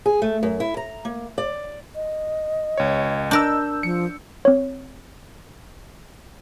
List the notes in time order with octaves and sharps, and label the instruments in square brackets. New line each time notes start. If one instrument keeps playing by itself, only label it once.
[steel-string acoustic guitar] G#4
A3
F#2
E4
A#5
A#3
D5
[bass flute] D#5
[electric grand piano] C#2 C#5
[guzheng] D4 A#4 [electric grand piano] E6 G6
[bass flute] F3 [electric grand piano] C#7
[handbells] C4 C#5